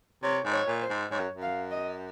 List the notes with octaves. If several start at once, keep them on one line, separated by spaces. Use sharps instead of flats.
C3 C#5
G#2
C#5
A#2
C5
G#2
G#2 C#5
F#2
F#2
F5
D#5